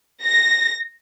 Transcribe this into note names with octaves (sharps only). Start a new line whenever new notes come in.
A#6